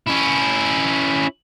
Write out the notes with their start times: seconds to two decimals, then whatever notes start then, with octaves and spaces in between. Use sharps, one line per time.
0.07 C#4 E4